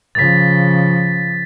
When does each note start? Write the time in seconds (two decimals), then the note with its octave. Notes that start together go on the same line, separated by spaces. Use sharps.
0.15 C#3 F3 A6 B6